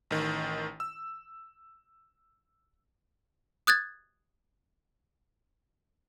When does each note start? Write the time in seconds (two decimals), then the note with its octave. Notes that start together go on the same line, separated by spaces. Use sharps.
0.11 A1 D#3
0.80 E6
3.67 D#6 F#6 G#6 A6